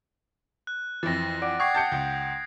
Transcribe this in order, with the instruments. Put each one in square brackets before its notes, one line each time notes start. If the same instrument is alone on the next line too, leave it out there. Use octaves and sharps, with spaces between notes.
[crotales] F#6
[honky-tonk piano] F2 E3 [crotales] A6 A#6
[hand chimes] D5 F#5 D6 [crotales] D7
[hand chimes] F#5 G5 [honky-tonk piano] C#6 [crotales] D#6 G#6 C7
[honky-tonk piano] A5 G6 C#7
C#2